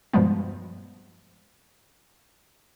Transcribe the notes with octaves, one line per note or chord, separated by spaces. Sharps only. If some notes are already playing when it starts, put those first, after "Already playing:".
G2 B2 F3 G3 G#3 B3